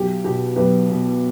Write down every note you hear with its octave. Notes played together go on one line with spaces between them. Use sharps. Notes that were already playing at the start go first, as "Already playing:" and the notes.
Already playing: B1 G4
B2 B3 G4
B1 G4 B4
B2 B3